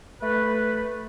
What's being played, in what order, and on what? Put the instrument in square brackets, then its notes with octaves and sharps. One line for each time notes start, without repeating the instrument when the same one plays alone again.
[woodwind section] A3 B4